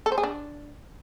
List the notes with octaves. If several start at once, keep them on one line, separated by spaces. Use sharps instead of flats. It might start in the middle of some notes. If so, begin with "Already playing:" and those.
A4
C5
G#4
D4